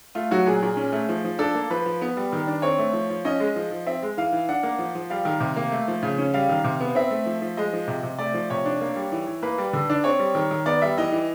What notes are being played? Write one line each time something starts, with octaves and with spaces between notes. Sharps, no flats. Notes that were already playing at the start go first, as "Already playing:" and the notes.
A3 F4
F#3 F#4
A#2 G#4
A#2
C#4
A3
F3
F3
D4 A4
A#3
F3 B4
F3
B3
G3
D#3
D4
C4 C#5
A3
F3
F3
C#4 D#5
G#3
F3
F3
C4 E5
G#3
E3 F5
E3
D4 F#5
A#3
F3
F3
G3 F5
D#3
C3
A#3
A3
F3
C#3
C#4
G3 F5
D#3
C3
B3
C4 E5
A3
F3
F3
G#3 D#5
F3
C3
C3
A3 D5
F3
C3 C#5
D4
A#3
G3
E3
E3
A#3 B4
G3
D3
D4
C4 C#5
G3
D#3
D#3
B3 D5
G3 E5
E3 D#5
E3